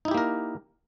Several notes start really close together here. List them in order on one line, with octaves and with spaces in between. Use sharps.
D#4 E4 G4 A#3 A#4